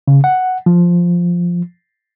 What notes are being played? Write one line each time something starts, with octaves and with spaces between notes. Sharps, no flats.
C#3
F#5
F3